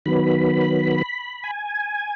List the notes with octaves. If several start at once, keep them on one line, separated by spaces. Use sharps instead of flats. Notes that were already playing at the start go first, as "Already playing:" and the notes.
D#3 F#3 B3 B5
G#5